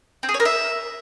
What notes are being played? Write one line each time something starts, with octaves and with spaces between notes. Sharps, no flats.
C4
G#4
C#5
A#4
E5